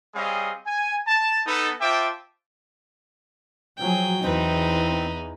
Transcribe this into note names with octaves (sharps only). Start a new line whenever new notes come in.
G3 C4 G#4 C#5 D#5 F5
G#5
A5
B3 D#4 A4
F4 C5 E5 G5 A5 D6
F3 F#3 G#4 G5
E2 C4 D#4 B4